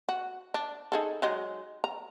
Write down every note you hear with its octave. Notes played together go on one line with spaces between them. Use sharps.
F#4
D4
D#4 G#4 A4
F#3 G#3 D#4
A#5